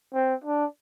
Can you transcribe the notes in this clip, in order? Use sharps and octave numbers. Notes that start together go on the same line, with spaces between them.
C4
D4